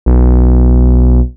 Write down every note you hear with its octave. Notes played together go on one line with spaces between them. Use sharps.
B1